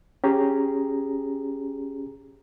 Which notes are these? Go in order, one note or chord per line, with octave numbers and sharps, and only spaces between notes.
C#4 G4 G#4 A#5